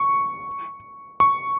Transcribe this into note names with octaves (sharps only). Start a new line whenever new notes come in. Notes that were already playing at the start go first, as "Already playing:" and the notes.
Already playing: C#6
C#6